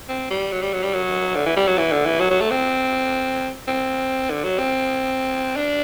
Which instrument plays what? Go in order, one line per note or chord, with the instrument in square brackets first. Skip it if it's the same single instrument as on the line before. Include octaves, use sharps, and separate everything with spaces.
[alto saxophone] C4
G3
F#3
G3
F#3
G3
F#3
D3
E3
G3
F#3
E3
D3
E3
F#3
F#3
A3
C4
C4
D3
F#3
C4
D4